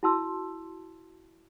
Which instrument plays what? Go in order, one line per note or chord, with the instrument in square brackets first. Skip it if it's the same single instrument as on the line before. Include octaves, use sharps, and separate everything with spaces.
[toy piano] E4 F#4 A5 C6 E6